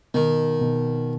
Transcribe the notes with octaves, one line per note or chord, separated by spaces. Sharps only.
B2 D#3
B2